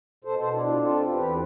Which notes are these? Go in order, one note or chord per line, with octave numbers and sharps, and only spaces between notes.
B2 A4 C5
A4 C5
D4 E4
F4
C4 F4 A4
E2 G4 B4